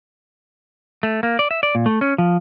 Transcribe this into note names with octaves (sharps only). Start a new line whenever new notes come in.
A3
A#3
D5
E5
D5
A#2
A3
C#4
F3